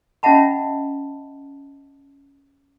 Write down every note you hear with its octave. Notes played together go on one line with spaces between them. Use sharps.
C#4 D#5 E5 F#5 A5 B5